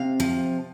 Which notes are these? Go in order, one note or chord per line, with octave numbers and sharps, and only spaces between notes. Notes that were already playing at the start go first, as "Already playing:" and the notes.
Already playing: C3 F5
F3